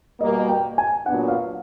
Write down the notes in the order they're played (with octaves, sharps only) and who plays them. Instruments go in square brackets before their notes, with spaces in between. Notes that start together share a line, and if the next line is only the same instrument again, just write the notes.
[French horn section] B2 G3 A#3 [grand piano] D#5
[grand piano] G5
G#5
[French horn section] A#2 F#3 B3 D4 [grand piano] F#5
[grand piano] F5